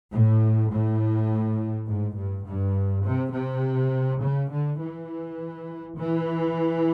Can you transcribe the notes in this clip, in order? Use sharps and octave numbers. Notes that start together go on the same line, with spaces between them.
A2
A2
G#2
G2
G2
C3
C3
C#3
D3
E3
E3